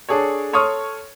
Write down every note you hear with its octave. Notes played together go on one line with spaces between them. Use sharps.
D4 G#4 A4 C#5
A4 C#5 C6 C#6 D#6 F6